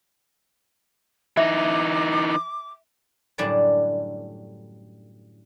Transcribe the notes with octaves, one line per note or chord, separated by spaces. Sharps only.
E3 D#4 E5 D6
F#2 A2 D3 G3 D5 A5